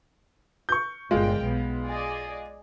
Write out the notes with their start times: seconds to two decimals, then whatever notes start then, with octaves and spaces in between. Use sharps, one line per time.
0.69 C#6 G6
1.11 G1 A#2 G#3 F4 G5
1.40 B1 B3
1.85 G#4 D5 D#5